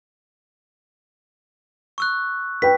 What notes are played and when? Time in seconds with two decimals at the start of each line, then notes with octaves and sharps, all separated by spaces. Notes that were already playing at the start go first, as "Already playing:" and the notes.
1.98 C#6 E6 F#6
2.62 B4 G5 B6